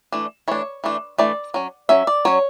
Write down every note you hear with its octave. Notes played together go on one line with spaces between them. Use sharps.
E3 A3 D4
E3 A3 D4 C#5
E3 A3 D4
E3 A3 D4 D5
F#3 C#4
F#3 C#4 E5
D5
F#3 C#4 C#5